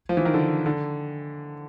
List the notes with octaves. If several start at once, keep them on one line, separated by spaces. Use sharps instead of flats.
F3
E3
D#3
D3
D3